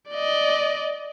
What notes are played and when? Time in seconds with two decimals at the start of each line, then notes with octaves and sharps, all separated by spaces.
0.10 D5 D#5